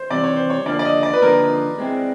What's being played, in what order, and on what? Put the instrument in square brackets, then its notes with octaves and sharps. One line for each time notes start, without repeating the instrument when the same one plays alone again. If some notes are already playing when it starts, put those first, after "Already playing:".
Already playing: [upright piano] C5
[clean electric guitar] C3 E3 G3 [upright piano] D5
[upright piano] C#5
C5
C#5
[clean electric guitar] D3 F3 A#3 [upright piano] D5
[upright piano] D5
D#5
D5
B4
[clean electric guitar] D3 F3 A#3 [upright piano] A#4
[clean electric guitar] G#3 C4 E4